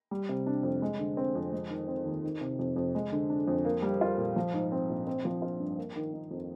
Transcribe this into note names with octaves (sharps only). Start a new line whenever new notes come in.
G3
C3
D4
F2
G#3
D3
C4
F2
G#3
D#3
C4
D#2
D#3
C3
F2
F2
G#3
D3
D4
F2
A#3
G3
F4
A#2
F3
G#2
C4
A#1
C4
F3
F4
G2
A#3
D#3
D#4
F2